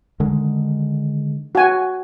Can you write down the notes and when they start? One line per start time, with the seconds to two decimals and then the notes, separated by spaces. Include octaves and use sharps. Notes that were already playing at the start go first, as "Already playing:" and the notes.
0.20 D3 D#3 G#3
1.55 F#4 G#5